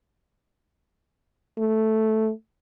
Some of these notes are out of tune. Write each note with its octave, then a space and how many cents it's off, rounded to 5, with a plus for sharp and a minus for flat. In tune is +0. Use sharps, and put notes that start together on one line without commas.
A3 -5